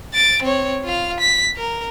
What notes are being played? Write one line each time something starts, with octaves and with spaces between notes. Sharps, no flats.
A6 D7
C4 C#5
F4 F5
B6
A#4